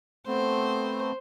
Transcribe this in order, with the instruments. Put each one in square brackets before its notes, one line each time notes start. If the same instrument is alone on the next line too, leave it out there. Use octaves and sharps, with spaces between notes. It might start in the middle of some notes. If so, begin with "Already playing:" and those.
[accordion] A3 B3 C4 [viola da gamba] C5